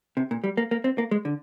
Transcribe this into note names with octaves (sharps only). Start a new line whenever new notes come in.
C3
A#2
G3
A#3
A#3
C4
A#3
G#3
D3